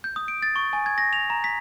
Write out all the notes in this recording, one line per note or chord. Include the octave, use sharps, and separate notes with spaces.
G6
D#6
D7
A6
C#6
G#5
G#6
A#6
F7
A#5
B6